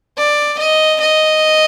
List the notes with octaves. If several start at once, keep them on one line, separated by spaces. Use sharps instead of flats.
D5
D#5
D#5